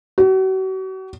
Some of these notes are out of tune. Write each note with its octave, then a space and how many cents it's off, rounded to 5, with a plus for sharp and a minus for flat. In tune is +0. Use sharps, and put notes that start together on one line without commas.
F#4 +40